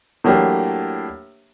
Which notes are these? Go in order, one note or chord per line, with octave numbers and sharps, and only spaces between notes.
A2 F#3 A#3 D4 G4